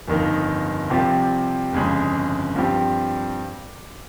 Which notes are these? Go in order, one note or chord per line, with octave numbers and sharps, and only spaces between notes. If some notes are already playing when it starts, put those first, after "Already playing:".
G1 F2 D#3 A#3 D#4
C2 C3 F3 C4 G4
G1 F2 C#3 G#3
G2 F3 C4 G4